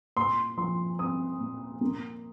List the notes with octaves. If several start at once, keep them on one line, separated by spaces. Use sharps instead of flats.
A#2 C6
F3 C6
C4 D#6
A#2
A#3